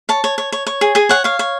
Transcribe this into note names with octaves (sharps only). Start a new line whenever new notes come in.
C#5 A5
C#5
C#5
C#5
C#5
G#4
G#4 G#5
C#5 F#5
C#5 F5
C#5